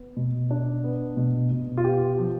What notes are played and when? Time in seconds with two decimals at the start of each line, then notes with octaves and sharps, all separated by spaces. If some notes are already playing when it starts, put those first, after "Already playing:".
Already playing: B3
0.17 B2
0.51 D4
0.84 B3
1.17 B2
1.51 B2
1.77 F4
1.84 B3 G4
2.18 F3